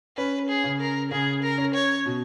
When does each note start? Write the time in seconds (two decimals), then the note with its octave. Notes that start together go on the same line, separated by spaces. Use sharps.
0.17 C#4 B4
0.49 G#4
0.64 C#3
0.80 A#4
1.11 C#3 G#4
1.42 A#4
1.58 C#4
1.74 C#5
2.06 B2